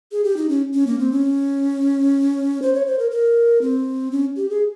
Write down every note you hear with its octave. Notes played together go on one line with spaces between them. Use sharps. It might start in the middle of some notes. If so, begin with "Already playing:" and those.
G#4
G4
D#4
C#4
C#4
A#3
C4
C#4
C5
C#5
C5
A#4
A#4
C4
C#4
G4
G#4